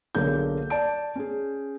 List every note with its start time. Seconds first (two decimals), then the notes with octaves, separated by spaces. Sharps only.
0.15 B1 D3 A#3 G#4 G6
0.70 D5 A5 D7
1.16 C#4 G#4